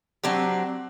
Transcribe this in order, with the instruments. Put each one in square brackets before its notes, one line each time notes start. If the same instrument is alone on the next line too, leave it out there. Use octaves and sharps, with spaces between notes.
[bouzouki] F#3 C4 D4 G4